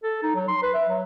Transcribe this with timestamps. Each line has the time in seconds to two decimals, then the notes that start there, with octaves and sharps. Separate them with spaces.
0.03 A4
0.23 D#4
0.35 F#3
0.48 C6
0.63 B4
0.74 E5
0.89 F#3